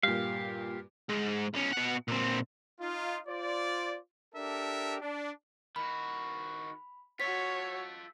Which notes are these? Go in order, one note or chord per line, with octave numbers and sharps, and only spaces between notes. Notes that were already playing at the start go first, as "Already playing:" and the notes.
G2 A#2 G4 F5
G#2
B1 C#4
B2 F#5
A#2 C4
D#4 F4
F4 C5 D5
D4 G4 A4 A#4 E5
D4
D#3 F#4 B5
F4 F#4 A4 C#5 B6